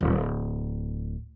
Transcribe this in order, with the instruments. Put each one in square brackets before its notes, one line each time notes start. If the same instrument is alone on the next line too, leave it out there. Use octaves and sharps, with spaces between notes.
[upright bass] D1